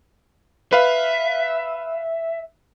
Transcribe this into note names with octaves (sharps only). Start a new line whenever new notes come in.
B4 E5 F5